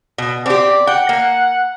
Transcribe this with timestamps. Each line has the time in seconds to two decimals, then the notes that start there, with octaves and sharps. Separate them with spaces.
0.18 B2
0.46 C4 G4 D5
0.87 F#5 G5
1.09 A#3